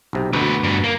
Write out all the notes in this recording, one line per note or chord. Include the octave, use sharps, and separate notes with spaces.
B1 C3 G4
D2 B2 C4 B4
G2 B3
A#3